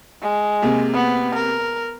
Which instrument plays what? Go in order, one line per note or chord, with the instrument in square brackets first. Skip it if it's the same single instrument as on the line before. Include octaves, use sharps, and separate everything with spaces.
[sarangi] G#3
[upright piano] C3 A#3 G#4
[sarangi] B3
A#4